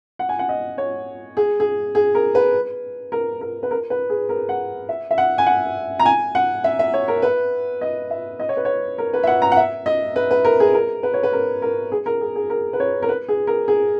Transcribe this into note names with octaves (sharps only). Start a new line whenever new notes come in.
F#5
G#5
F#5
D#5
C#5
G#4
G#4
G#4
A#4
B4
A#4
A#4
B4
A#4
B4
G#4
A#4
F#5
E5
E5
F#5
G#5
F#5
A#5
G#5
F#5
E5
E5
C#5
A#4
B4
D#5
E5
D#5
C#5
B4
C#5
A#4
B4
E5
F#5
A#5
F#5
E5
D#5
B4
B4
A#4
G#4
A#4
B4
C#5
B4
A#4
A#4
G#4
A#4
G#4
G#4
A#4
B4
C#5
A#4
B4
G#4
A#4
G#4